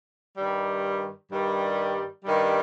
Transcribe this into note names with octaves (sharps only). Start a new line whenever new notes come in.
G2 D#3 G3
G2 D#3 G3
G2 D#3 G3